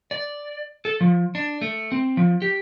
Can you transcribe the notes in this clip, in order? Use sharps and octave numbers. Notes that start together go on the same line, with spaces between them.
D5
A4
F3
D4
A3
C4
F3
G4